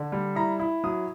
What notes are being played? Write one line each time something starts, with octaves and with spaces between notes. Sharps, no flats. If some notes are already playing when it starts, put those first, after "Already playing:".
Already playing: D3
G3
E4 A#5
E4
F#3 D#6